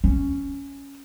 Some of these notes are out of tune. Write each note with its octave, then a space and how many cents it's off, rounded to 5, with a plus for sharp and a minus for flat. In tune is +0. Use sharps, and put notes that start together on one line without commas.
C#4 +5